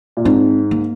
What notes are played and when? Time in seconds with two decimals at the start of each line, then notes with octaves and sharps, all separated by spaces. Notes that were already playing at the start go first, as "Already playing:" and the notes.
0.17 A#2
0.25 G#2 C4
0.71 A#3